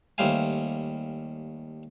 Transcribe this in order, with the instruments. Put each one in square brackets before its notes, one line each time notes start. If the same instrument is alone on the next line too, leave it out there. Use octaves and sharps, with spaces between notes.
[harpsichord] D#2 G3 A3 C5 F5 G#5